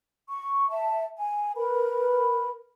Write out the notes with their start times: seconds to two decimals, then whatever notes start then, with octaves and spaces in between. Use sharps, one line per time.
0.28 C#6
0.69 E5 A5
1.17 G#5
1.56 A#4 B4 B5